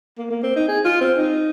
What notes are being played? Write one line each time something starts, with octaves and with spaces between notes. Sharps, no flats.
A#3
A#3
C4
D#4
G#4
F4
C4
D#4